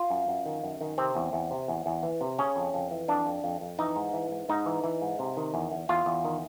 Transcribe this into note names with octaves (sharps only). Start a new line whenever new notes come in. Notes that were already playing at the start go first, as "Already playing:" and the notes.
Already playing: F4
F#2
F#2
D#3
F#2
D#3
C3 C4
E2
E2
C3
E2
E2
E3
C3
C#3 C#4
F2
F2
E3
F2 D4
F2
F2
F2
E3 D#4
G#2
E3
G#2
G#2 D#4
E3
E3
G#2
C3
D#3
E2
E2
E2 F4
E2
D#3